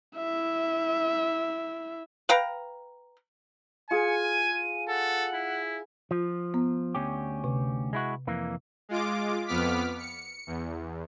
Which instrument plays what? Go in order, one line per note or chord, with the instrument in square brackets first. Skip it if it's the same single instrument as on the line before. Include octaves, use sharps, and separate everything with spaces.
[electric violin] E4 E5
[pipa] B4 F5 G5 A#5
[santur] F4 G#4 [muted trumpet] G#5 [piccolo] C#7
[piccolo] D#7
[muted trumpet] A4 [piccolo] F#5
[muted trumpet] E4
[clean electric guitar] F3 [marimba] F4
[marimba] B3
[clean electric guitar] D2 C#4 G4
[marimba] C3
[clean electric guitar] G#3 E4 F#4
F2 E3 A#3
[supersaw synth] G#3 F4 D6
F2 B3 D6 F6 B6
C#7
E2